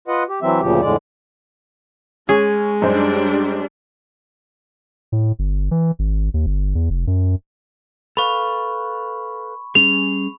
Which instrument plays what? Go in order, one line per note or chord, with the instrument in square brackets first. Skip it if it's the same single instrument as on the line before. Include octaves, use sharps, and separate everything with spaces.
[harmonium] F4 B4 D#5 F#5
G4
E3 F#3 C4 E5
D2 A#2 C#3 F3 G4
F2 A2 D3 G#3 D5
[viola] G#3 [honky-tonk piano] C#4 [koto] G#4
[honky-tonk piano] F#2 D#4 C5 [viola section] G3 D4
[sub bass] A2
G1
E3
G#1
D#2
G1
E2
F1
F#2
[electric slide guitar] A4 B4 F5 [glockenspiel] B5 C#6
[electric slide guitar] G3 C#4 G#4 [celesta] F7